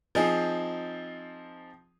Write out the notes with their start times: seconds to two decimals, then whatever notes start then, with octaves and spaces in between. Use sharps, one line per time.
0.15 F3 C4 D#4 G#4